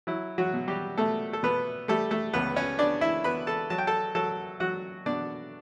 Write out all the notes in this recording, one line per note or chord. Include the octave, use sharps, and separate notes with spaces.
F#3 E4
F#3 F#4
B2
G3 G4
B2 A3 A4
A4
B2 B3 B4
G3 A3 A4
A3 A4
C#2 B3 B4
C#4 C#5
B3 D4 D5
E4 E5
B3 B4 B5
A4 A5
F#3 A5
G5
A4 A5
F#3 A4 A5
F#3 F#4 F#5
B2 D4 D5